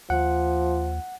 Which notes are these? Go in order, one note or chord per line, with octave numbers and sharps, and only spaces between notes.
D#2 F3 F#5